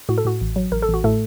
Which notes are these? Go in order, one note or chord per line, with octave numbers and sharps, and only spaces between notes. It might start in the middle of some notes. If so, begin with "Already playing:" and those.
A2 F#4
A4
A2 F#4
A1
F#3
A1 A#4
A4
A1
F#4
A2 A3 A4